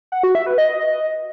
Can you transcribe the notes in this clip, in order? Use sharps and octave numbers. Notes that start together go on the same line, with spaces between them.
F#5
F#4
E5
B4
D#5